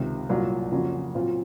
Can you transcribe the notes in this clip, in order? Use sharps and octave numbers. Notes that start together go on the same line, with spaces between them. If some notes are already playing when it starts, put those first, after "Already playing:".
Already playing: C#2 C3 D#3
C2 A#2 F#3 A#3 F4
F2 C#3 F#3 A#3 F4
A#2 F#3 C4 F4